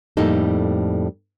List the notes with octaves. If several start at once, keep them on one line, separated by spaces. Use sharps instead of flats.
F2 A2 G3 A#3 D#4 A4